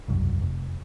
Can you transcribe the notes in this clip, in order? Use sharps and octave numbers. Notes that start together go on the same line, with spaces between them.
E1 C2 F#2
F1